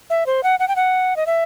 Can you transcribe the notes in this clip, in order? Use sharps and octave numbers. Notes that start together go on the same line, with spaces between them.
E5
C5
F#5
F#5
G5
F#5
D#5
E5